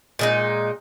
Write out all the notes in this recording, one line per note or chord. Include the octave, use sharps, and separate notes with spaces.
A#2 G#3 D#4